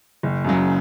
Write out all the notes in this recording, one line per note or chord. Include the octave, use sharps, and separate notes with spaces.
F#1
F#2 C#3 F#3